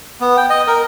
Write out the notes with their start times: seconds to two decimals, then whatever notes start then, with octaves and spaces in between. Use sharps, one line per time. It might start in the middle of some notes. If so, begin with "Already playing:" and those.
0.21 B3
0.37 G5
0.50 D#5
0.67 A#4